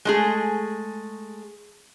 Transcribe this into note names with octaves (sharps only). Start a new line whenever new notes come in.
G#3 A3 G#4